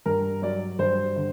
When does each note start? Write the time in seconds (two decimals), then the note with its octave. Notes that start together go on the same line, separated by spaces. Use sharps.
0.06 G2 A#4
0.42 F#3 D5
0.79 G2 C5
1.16 D3